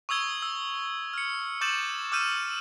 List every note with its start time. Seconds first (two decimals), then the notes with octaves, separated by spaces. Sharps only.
0.09 C#6 D#6 E6 G#6 G7
0.42 E6
1.13 F6 C#7
1.61 C#6 D6 G6 A6 E7 F#7
2.12 D6 E6 F6 G6 D#7 E7